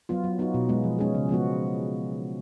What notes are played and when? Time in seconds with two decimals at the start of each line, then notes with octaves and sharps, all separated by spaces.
0.09 F#3 B3 F4
0.24 F#3
0.39 B3 D#4 F#4
0.54 B2
0.69 G#3 B3
0.84 F3
0.99 G#3 C#4 G#4
1.15 C#3
1.29 F3 G#3 B3 F#4